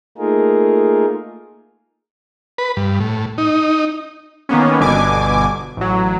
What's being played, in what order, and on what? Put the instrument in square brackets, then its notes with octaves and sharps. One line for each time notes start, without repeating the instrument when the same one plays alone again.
[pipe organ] A3 A#3 D#4 F4 G#4 A#4
[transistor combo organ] B4
G2
A2
D#4
[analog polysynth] D#3 A#3 B3 C#4
G1 B2 D3 G#5 D6
A1 F#3